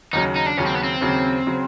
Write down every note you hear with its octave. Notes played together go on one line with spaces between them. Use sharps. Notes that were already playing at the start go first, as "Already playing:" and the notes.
D#2 C#3 F#3 D#4
D#4
D4
D#2 C#3 F#3 C#4
C4
B3
C4
D#2 C#3 F#3
C#3 F#3